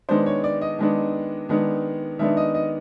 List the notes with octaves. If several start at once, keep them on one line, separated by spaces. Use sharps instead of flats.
D#3 G#3 B3 D4 C5
C#5
D5
D#5
D#3 G#3 B3 D4
D#3 G#3 B3 D4
D#3 G#3 B3 D4 E5
D#5
D#5